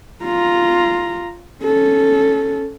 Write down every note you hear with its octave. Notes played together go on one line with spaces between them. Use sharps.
F4 A#5
C#4 A4